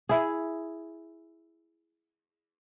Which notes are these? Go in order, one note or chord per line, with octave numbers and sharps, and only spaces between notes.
E4 G#4